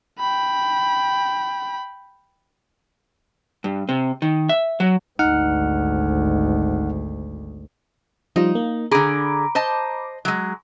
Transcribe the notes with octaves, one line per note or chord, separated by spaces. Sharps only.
G5 B5
G2
C3
D#3
E5
F#3
G#1 D2 D#4 F#5 F6
F3 G3 D#4 F4
A#3
D3 G#4 A#5 B5 D6
C5 D#5 A5
F#3 G#3